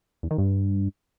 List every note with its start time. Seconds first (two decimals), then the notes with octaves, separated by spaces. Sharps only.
0.23 E2
0.31 D#3
0.38 G2